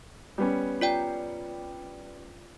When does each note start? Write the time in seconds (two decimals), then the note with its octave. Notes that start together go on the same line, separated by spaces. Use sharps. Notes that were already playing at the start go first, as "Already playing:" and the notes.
0.38 G3 B3 C#4
0.81 F4 D5 G5